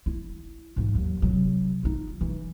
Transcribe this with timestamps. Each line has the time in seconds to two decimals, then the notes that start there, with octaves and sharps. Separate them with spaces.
0.06 E4
0.76 G#2 E3
0.95 D#2 F#3
1.22 C3 F#3
1.83 D#4 F4
2.21 E3